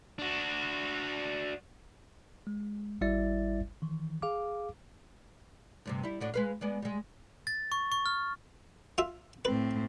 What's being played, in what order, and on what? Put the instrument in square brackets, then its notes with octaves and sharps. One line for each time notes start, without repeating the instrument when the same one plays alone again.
[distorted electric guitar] D4 F#4
[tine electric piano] G#3
G#1 G3 E4 D5 E5 A6
D#3 E3
G#4 F5 D6
[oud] D2 G2 C3
G3 E4
A2 D4 F#4
G#3 B4 F5
G#3 B3 D5
G3 G#3
[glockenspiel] A6
C#6
C#6
F6
[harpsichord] F4 E5
[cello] A2 C4 [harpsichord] B4